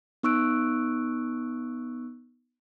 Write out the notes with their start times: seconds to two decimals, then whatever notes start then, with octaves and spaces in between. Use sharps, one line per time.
0.23 B3 D#4 C#6 E6 F#6 D7